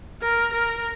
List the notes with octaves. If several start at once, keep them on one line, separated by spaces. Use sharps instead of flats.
A#4
A#4